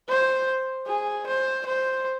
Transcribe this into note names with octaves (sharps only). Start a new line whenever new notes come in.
C5
G#4
C5
C5